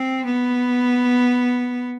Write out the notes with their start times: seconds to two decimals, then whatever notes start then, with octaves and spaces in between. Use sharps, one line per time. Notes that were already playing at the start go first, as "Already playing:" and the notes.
Already playing: C4
0.25 B3